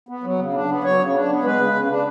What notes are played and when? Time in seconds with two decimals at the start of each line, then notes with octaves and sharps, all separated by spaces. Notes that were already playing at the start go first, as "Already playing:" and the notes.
0.09 B3
0.23 F#3
0.39 C#3
0.53 D4
0.69 B3
0.84 F#3 C#5
0.99 C#3
1.14 D4
1.29 B3
1.44 G#3 B4
1.59 C#3
1.74 C#3
1.90 D4